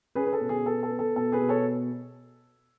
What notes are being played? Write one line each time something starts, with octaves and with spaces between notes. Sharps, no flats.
C#4 G#4 B4
B4
A4
B2
G#4
B3 A4
A4
B3
A4
B2 A4
G#4 B4
B2
A4 C#5